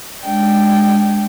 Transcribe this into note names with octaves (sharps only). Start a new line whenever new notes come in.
G#3 D4 G5